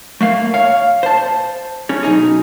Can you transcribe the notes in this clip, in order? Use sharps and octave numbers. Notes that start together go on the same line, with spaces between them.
A3 A#3 F5
C#5 F5
C5 A5
C#4 G#4
B1 E2 D#4 G#4